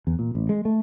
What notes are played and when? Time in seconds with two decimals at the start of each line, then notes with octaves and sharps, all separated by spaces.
0.07 E2
0.19 A#2
0.35 A1
0.49 G#3
0.65 A3